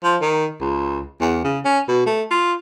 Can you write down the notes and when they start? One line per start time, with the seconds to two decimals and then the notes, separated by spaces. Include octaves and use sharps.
0.03 F3
0.21 D#3
0.61 C#2
1.21 E2
1.44 C#3
1.65 C#4
1.88 B2
2.06 A3
2.31 F4